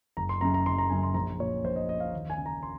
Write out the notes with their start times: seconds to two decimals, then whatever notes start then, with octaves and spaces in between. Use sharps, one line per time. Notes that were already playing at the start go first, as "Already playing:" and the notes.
0.17 F#1 A#5
0.29 C6
0.41 F#2 C#3 A#5
0.54 A#5
0.66 F#1 C6
0.78 A#5
0.90 F#2 C#3 G#5
1.03 C6
1.14 A#1 A#5
1.40 A#2 C#5
1.64 A#1 C5
1.76 D#5
1.88 A#2 D#5
2.00 F5
2.13 D#2
2.30 G#5
2.38 C#3
2.46 A#5
2.63 C6